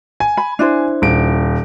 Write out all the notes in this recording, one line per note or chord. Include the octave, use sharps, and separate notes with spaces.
G#5
B5
D4 E4 C5
D#1 D7